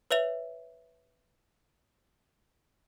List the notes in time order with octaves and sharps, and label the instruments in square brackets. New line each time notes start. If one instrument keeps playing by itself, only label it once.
[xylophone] B4 C#5 E5 F7